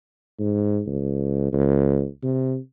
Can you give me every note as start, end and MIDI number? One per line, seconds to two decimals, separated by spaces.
0.39 0.81 44
0.87 1.50 37
1.52 2.06 37
2.23 2.57 48